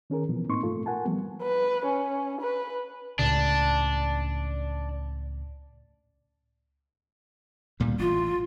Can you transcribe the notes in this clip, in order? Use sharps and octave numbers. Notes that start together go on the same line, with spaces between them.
D#3 C#4 G#4 A#4
B2 E3 F3 B3
A2 A#3 C4 D#4 C6 C#6
G2 A3 F4 A4
A#4 F#5 G#5 A5
E3 F3 G3 A3 B3
B4
C#4
B4
C#2 A2 C#3 D4
D2 A#2 G3
A1 F4